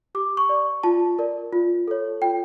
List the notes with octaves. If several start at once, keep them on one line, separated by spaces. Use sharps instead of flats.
G4 D6
C#6
D5
F4 A5
A#4 D5
F4
A4 C#5
F4 G5